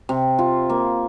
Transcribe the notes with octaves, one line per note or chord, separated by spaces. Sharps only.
C3
F4
A#3